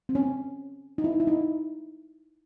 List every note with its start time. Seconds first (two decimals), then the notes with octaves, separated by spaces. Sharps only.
0.09 C4
0.15 C#4
0.98 D#4
1.04 E4
1.20 E4
1.27 D#4